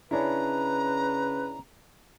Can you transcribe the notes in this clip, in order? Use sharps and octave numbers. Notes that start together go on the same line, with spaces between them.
C#3 C#4 D4 E4 B4 A#5